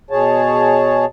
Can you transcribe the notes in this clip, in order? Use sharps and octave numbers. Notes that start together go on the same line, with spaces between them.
B2 G#4 C#5 A5